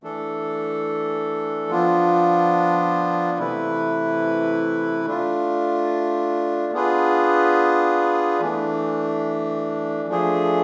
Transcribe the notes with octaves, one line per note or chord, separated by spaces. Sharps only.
E3 A3 D4 A4
F3 B3 D4 F4
C3 E3 A3 E4 B4
A3 D4 F4
B3 D4 F4 G#4 B4
E3 A3 D4
F3 A3 D4 G#4